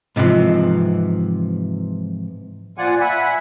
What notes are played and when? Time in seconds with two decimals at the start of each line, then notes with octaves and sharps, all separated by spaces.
0.16 G#2 C3 E3 F3
2.78 A#2 F3 F4 D5 F#5 G#5
3.00 E5 F#5 G#5 B5